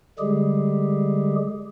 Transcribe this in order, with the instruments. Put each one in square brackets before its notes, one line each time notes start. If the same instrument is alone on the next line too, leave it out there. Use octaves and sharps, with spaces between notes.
[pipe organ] D3 G3 G#3 G4 G#4